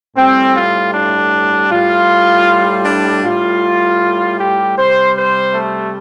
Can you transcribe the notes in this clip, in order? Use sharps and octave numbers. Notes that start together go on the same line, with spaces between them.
A2 G3 C4
F4
D4
A2 G3 F4
D4
A2 G3 F4
G4
C3 G3 C5
C5
A3